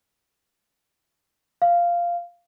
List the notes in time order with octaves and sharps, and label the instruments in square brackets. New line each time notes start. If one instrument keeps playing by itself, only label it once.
[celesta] F5